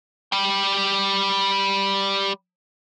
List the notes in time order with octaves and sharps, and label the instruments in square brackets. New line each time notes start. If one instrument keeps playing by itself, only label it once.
[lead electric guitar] G3 G5